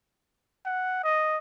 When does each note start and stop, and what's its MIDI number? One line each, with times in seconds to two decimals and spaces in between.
0.65 0.99 78
1.04 1.37 75